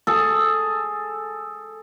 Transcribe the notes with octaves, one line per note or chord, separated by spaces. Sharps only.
G#4 A4